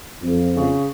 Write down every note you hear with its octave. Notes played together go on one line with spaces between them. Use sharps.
F2
C#3